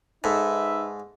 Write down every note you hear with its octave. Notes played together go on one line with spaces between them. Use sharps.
G#2 D#4 A4 B4 E5